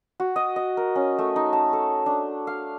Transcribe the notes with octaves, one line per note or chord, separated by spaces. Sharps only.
F#4
D#5
D#5
A#4
C#4
A3
D#4
A5
A4
D4
F5